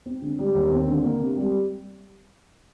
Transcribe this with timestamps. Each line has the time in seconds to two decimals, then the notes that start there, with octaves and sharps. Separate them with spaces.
0.06 C4
0.22 D3
0.39 G3
0.55 D#2
0.71 C4
0.88 D3
1.04 A#3
1.20 C3
1.37 G3